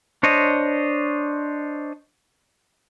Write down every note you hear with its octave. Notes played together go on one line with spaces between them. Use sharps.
D4 C5 C#5 D#5